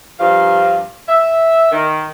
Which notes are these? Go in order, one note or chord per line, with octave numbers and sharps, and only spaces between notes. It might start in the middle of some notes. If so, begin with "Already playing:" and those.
G2 F3 F5
E5
D#3